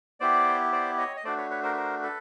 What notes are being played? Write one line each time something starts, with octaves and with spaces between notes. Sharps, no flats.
B3 E4 G4 C5 D5
C5 D5
C#5 D#5
D#5
A3 D4 F#4 C5 D5
B4 C#5
B4 C#5
A#4 C5
B4
A#4 C5
A4 B4